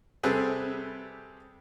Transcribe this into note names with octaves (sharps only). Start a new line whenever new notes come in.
C3 G3 C4 G#4 A4 B4